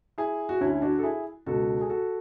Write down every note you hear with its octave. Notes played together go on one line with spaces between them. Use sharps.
E4 G#4
F#4
D2 D3 C#4 E4
D4 F#4
A4
E4 G#4
C#2 B2 F#4 A4
G#4
F#4 A4